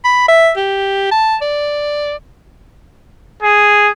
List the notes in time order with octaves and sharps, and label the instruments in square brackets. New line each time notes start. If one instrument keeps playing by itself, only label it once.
[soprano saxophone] B5
E5
G4
A5
D5
[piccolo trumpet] G#4